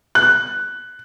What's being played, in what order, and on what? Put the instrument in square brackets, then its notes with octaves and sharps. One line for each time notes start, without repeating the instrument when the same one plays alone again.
[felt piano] F#6